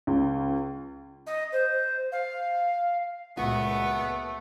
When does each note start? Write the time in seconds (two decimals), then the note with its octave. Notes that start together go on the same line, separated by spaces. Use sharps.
0.07 C#2
1.27 D#5
1.52 C5
2.12 F5
3.37 C#2 A#2 A3 B3 F#4 C#6